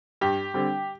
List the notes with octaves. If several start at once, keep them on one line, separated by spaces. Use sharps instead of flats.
G2 G4
D3 G3 C4